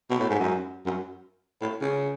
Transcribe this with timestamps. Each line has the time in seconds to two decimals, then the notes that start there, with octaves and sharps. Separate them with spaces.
0.10 B2
0.20 A2
0.30 G#2
0.39 F#2
0.86 F#2
1.61 A2
1.81 C#3